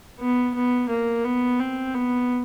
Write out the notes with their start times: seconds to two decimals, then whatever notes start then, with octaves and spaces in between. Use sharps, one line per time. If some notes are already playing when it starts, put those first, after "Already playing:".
0.20 B3
0.54 B3
0.89 A#3
1.24 B3
1.60 C4
1.94 B3